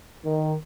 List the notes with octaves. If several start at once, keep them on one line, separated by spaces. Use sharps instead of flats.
D#3